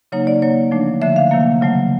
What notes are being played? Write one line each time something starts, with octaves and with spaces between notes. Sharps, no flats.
C#3 F#3 A#3 D#4 C#5
D5
D#3 F#3 A#3 C#5
D3 F3 A3 D4
D3 F3 A3 E5
F5
C3 D#3 F#3 A#3
C#3 F#3 A3